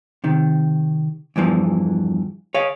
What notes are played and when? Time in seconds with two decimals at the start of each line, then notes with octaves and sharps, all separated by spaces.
0.24 C3 D#3
1.36 E2 G2 E3 F3
2.55 C#5 D#5 F5